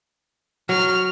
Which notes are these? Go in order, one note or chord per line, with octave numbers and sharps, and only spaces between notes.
F#3 F6